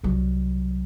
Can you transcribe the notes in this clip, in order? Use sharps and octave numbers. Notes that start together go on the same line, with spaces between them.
C2 F#3